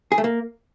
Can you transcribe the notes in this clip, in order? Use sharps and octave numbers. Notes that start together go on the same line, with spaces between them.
G#4
A3
A#3